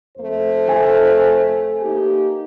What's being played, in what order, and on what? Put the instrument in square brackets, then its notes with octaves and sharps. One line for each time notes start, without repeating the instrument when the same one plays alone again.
[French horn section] F2 A3 C5
[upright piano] A4 G#5
[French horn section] A#3 D#4 G4